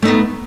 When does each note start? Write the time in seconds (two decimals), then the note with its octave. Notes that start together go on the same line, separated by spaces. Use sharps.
0.02 A3
0.05 D#4
0.08 B3